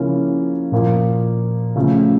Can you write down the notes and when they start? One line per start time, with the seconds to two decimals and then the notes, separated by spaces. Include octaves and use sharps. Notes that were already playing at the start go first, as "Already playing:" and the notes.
Already playing: C#3 F3 A#3 C#4 E4
0.72 A#2 F3 A#3
1.76 C#3 F3 A3